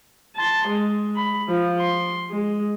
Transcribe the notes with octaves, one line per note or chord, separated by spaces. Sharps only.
A5 C6
G#3
B5
F3
C6
G#3